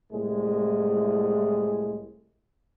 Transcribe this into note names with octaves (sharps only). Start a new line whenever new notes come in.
C2 A2 G#3